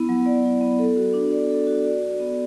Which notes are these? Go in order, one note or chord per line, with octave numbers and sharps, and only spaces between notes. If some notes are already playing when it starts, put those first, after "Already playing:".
Already playing: B3 E4
F#3
D5
E4
B3
A4
F#4
D4
D5
A4
F#4
D5
F#4
B3